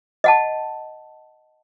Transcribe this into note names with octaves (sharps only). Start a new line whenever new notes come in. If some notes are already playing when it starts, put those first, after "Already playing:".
D#5 F#5 A5